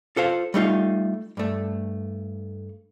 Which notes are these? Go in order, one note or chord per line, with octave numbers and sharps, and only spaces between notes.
F4 A4 C5 F5
G3 A3 D#4 F4
G2 A3